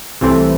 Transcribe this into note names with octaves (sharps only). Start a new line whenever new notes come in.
C2 C3 E3 A3 C4